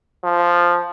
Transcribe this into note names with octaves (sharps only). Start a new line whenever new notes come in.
F3